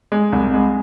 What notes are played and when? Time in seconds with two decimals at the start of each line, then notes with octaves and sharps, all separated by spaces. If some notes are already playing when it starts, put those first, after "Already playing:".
0.12 G#3
0.32 C2
0.54 G#3